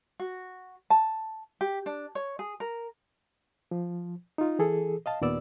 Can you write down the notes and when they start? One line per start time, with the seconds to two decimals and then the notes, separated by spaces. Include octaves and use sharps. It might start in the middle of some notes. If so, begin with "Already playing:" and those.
0.20 F#4
0.90 A5
1.61 G4
1.86 D4
2.15 C#5
2.39 G#4
2.60 A#4
3.71 F3
4.38 D#4 F4
4.59 E3 G#4 A4
5.06 D#5 F5 A5
5.21 D#2 A#2 B3 D5 E6